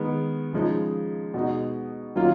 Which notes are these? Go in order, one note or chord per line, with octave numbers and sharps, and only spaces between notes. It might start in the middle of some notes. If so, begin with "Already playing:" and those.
Already playing: D#3 G#3 B3
C#3 F3 G#3 D#4
B2 G#3 D#4
D#3 F#3 A#3 C#4 F4